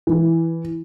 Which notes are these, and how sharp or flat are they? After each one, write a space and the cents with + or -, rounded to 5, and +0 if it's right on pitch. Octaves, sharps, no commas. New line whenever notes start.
E3 +0